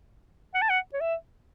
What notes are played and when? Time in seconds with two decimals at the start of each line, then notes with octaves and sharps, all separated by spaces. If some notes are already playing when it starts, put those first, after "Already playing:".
0.54 F#5
0.61 A5
0.69 F#5
0.93 C#5
1.00 E5